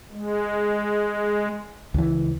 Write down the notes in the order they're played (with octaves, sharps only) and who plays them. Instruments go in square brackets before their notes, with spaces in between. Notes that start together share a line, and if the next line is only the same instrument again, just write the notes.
[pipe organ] G#3
[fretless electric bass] C#2 E3